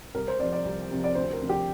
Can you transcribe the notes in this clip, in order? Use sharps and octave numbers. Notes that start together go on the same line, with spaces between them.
C2 A#4
C5
C3 F3 D5
D5
C2
C3 F3
D5
D2 C5
A#4
C3 F3
G4